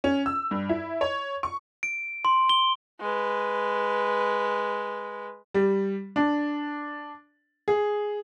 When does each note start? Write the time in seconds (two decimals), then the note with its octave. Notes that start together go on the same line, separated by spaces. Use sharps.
0.04 C#4
0.26 E6
0.51 G2
0.69 E4
1.01 C#5
1.43 C#6
1.83 D7
2.25 C6
2.49 G7
3.00 G#3 B4
5.54 G3
6.16 D4
7.68 G#4